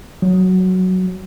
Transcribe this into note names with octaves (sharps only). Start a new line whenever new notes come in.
F#3